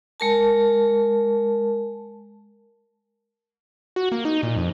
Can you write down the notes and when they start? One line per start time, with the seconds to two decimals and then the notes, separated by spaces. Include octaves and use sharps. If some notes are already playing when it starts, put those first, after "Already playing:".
0.20 G#3 A#4 A5
3.96 F#4
4.12 A#3
4.25 D#4
4.43 A#2
4.56 F2